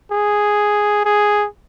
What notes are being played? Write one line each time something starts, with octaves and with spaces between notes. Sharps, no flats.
G#4
G#4